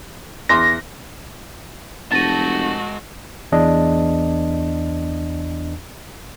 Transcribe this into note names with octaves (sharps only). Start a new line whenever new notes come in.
E2 C6 A#6
F1 G#3 F#4 A5 A6 A#6 D#7
E2 D4 D#5